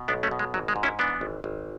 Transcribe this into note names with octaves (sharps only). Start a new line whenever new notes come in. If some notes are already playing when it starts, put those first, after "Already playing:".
Already playing: B2
B1 B3 D4
A3 C#4
B2
G#3
G#1 F#3
G#3
G#2
C#4 E4
E3 B3 D4
G#1
G#1